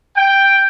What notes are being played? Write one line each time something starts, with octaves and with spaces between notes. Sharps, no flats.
G5